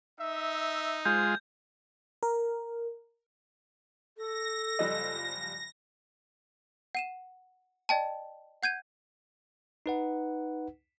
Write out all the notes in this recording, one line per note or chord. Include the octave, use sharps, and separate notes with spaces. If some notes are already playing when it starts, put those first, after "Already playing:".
D#4 E5
G#3 F4 C5 G6
A#4
A4 A#6
F#1 F3 G3 D#5
F#5 D#7 E7
D5 D#5 G5 A5
F#5 G6 G#6 D#7
D#4 B4 F#5